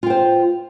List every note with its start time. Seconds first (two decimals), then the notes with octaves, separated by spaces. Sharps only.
0.03 F4
0.07 G5
0.10 C5